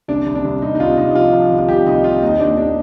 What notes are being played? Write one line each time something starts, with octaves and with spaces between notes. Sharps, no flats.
C2 D4
C2
D4
C2
C2 D#4
D#4
C2 F4
C2 D#4
D#4
F3 F4
F3
C2
F4
C2 G4
C2 D#4
C3 F4
D#2 D#4
D#2 D4
D4